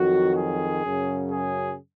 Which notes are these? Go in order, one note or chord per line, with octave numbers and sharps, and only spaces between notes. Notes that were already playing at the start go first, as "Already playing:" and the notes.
Already playing: F2 D#3 F#3 F#4
G#4
F#2 C#3 F#3
G#4